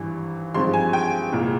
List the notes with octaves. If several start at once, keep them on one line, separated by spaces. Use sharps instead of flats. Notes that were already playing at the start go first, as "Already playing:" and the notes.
Already playing: G#1 G2 E3
G#1 G2 F3 G#3 C4 C6
G#5
G5
C2 A#2 G#3